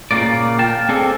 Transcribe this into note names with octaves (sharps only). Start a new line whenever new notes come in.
A#2 C#3 A#3 D5
F5 G5 A5
C4 G#4 A4 D5